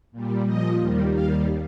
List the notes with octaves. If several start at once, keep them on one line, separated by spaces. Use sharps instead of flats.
A#2 G3
A#2 F3 D#5
D#2 D#3 G3
D#2 D#3 G3 F5